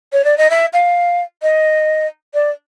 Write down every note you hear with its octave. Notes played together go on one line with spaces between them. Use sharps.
C#5
D5
D#5
E5
F5
D#5
D5